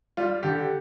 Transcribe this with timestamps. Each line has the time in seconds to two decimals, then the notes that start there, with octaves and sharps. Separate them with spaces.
0.17 G3 F4
0.43 D3 G4